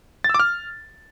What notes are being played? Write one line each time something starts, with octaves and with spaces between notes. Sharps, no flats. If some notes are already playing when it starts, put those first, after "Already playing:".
A6
E6
D6
F6